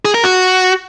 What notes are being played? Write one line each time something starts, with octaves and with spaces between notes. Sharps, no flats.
G#4
A#4
F#4